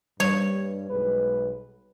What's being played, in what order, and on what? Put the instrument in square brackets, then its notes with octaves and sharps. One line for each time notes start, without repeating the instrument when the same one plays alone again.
[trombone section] G2 [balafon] G3 [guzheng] C#5
[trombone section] B1 G#3 B4